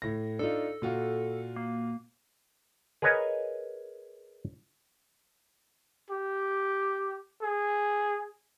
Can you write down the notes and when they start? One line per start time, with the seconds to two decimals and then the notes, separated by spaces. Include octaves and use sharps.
0.02 A2 A#6
0.39 D4 D#4 F4 A4
0.82 A#2 F4 F#4
1.56 A#3
3.02 G#4 A#4 B4 C#5 D#5 G#5
6.10 G4
7.42 G#4